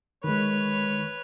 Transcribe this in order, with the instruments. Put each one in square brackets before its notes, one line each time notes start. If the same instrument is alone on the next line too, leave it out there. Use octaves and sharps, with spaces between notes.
[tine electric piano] D#3 G#3 [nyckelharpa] B4 C#5